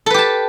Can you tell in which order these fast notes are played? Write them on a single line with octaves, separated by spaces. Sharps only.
A4 B4 G4 A5